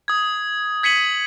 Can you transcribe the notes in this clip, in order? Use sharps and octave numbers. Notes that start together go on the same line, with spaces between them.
D#6 G#6
G#6 B6 C#7 D#7 F#7